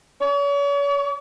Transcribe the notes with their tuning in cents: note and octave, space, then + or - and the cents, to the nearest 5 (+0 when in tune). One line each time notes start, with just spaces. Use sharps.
C#5 +40